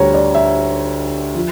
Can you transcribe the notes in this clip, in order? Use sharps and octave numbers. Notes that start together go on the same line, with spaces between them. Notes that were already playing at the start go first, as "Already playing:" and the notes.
Already playing: D2 D3 G3 C#5 A#5
D5
E5
F3